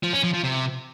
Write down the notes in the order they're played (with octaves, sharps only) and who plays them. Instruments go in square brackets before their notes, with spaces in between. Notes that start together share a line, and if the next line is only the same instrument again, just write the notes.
[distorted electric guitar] F3
C#4
F3
F3
C3